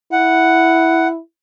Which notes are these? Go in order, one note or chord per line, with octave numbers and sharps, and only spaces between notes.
E4 F#5